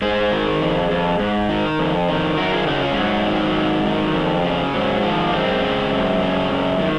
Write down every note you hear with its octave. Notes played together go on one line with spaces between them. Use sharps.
G#2 G#4 C5
D#3
F2
F2
G#2
D#3
F2
D#3
F#2 F#4 A#4
F4 G#4
C#3 D#4 F#4
C#4 F4
G#3
G#2 F#3
D#3
G#2
D#3
F2
C#3
G#2 F#3
D#3 F3 G#3
A#3
F#2 G#3 C4
C#3
F#2
C#3
F#2
D#3